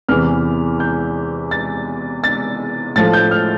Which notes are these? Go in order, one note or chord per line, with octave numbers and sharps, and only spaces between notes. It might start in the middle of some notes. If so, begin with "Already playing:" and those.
E2 C3 E3 F6
G6
A6
A6
A2 F3 A3 A6
G6
F6